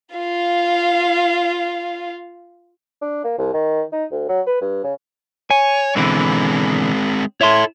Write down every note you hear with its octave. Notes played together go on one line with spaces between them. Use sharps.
F4 F5
D4
A#3
C2
D#3
D#4
D2
F#3
B4
G2
C#3
C#5 G#5
B2 D3 E3 G#3 C4
E4 A4 C#5 E5 C6